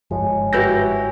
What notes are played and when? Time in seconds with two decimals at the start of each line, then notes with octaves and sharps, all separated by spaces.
0.11 G1 G#2 F3 C#5 G#5
0.53 E4 F#4 G4 B4 G6 A#6